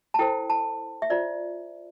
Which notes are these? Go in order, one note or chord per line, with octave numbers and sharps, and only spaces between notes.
A5
E4 A4 C5 G5
A5
E5
F4 C5 D5